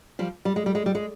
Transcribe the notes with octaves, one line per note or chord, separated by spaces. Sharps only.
F3 G3
G3
G#3
G3
G#3
G3
G#3